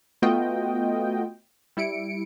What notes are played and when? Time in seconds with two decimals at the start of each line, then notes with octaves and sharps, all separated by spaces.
0.22 A3 B3 F4 F#4 D#5 G5
1.77 G3 E4 C#7 D7